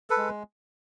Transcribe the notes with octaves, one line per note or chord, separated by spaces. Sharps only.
A4 B4
G#3